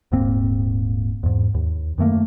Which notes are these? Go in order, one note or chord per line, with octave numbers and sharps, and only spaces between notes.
D#1 G#2 A#3 C4
E2 G#2
D#2
F#2 D#3 A3 A#3